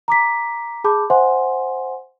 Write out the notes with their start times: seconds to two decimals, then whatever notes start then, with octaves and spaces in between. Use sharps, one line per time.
0.08 A#5 D6 B6
0.84 G#4 A5 B5 D6 G6
1.10 C5 E5 F#5 G#5 C6